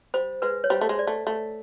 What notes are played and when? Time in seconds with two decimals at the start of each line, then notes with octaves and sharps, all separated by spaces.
0.14 G3 C5
0.42 G#3 B4
0.64 C#5
0.70 G3 C5
0.81 A3
0.89 G#3
0.99 D5
1.07 A3
1.27 A3